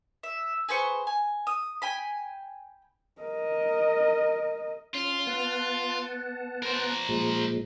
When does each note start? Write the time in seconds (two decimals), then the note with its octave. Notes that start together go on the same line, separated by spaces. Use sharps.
0.23 E5
0.68 G#4 B4 C5 C#6
1.07 G#5
1.47 D#6
1.82 G5 G#5 B5
3.22 A#4 D#5
4.95 C#4 F4
5.27 B3 F#5 A5
6.63 A#4 C5
7.09 A#2 F3 G#3